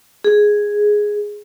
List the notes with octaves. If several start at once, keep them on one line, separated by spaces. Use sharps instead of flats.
G#4